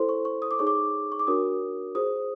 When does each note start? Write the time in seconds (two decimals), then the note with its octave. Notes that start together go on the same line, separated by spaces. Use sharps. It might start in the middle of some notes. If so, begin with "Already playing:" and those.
Already playing: E4 A4 C5 C6
0.09 C#6
0.25 C#6
0.42 D#6
0.51 D6
0.59 D#4 G#4 C#5 C#6
0.67 D6
1.12 C#6
1.19 D6
1.27 D4 F#4 A#4 C#5 D#6
1.95 F4 G#4 C5 D#6